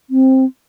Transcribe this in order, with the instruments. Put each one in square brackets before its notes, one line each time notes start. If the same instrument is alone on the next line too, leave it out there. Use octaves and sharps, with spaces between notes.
[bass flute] C4